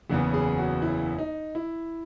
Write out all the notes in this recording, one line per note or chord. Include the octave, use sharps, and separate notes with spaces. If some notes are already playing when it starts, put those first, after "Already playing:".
F#1 E2 C#3 E3 B3 G#4
G#4
F#4
E4
D#4
E4